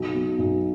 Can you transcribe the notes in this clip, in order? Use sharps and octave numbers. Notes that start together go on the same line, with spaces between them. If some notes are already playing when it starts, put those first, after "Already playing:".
Already playing: B1
B2
B1